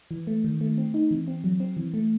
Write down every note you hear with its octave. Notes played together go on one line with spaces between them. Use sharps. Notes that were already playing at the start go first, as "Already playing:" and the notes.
E3
A3
D#3
A3
C4
D#4
E3
C4
F#3
C4
E3
A3